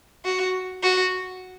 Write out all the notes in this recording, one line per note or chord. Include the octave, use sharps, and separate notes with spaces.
F#4
F#4